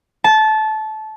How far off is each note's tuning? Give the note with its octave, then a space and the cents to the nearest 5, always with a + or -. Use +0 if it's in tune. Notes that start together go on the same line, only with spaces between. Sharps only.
A5 -20